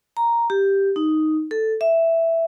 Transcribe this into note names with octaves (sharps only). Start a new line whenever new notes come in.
A#5
G4
D#4
A4
E5